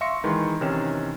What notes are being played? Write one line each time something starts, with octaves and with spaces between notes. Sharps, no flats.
E5 F5 C6 C#6 A#6 C#7
D#3 E3 G#3 C6
C3 D#3 E3 C#4 F6 E7